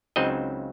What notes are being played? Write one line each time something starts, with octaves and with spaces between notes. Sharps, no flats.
C#2 C#3 F#3 C4 D#4 D#5